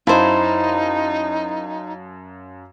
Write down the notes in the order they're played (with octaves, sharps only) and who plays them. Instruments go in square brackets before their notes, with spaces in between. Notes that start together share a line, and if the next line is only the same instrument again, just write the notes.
[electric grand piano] F#2 F5 A5 [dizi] D#4 [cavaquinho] E4 C5